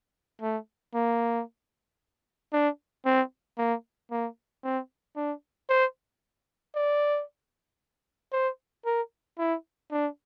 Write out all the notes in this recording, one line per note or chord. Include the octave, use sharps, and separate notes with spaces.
A3
A#3
D4
C4
A#3
A#3
C4
D4
C5
D5
C5
A#4
E4
D4